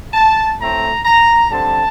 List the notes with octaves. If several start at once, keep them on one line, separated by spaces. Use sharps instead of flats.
A5
A2 A3 C4 A#5
A#5
D3 G3 C4 A5